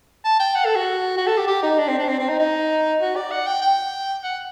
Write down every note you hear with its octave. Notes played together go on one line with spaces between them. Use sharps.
A5
G5
F#5
A4
F#4
F#4
A4
G4
G4
D#4
D4
C4
D4
C4
C4
D#4
D#4
F#4
D5
F#5
G5
G5
F#5